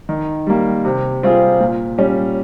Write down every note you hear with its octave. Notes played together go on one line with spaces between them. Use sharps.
D#3
G3 A#3
C3
G3 C4 F4 G#4
A#2
G3 C#4